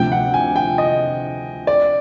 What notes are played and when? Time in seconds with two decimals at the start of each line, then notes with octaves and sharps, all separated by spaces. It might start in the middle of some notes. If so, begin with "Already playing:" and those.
Already playing: D2 C3 F3 G5
0.12 F#5
0.34 G#5
0.56 G5
0.78 D#5
1.67 D5